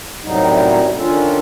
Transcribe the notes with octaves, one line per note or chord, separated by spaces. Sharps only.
F#2 A2 C3 F#3 G3 D#4
D#3 C#4 D4 F4 A4